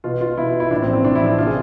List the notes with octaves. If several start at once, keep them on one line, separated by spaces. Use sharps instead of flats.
B2 F4
F4
B2 E4
E4
A2 D4
C4
F3
C4
A2 D4
E4
F3
E4
C3 F4
G#4